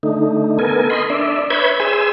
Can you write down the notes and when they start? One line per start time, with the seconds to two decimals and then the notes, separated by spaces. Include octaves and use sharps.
0.03 D3 A3 D#4
0.59 B3 A4 A#4 G#5
0.90 D#5 B5 C6
1.10 D4 D5 E5
1.50 B4 C#5 E5 B5 G6 G#6
1.80 G#4 C5 G#5 E6